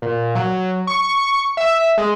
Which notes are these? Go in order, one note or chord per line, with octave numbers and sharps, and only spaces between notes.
A#2
F#3
C#6
E5
G#3